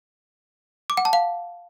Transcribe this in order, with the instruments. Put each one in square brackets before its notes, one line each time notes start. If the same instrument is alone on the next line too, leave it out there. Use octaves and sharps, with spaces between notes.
[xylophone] D6
F#5
A5
F5